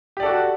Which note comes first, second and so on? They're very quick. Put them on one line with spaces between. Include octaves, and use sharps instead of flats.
G4 D5 A4 F#4